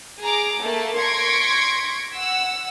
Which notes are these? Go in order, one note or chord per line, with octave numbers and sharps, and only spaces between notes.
G#4 A#5 D6
A3 A#3 A5
C6 C#6 G#6 A#6 B6 D7
F#5 E6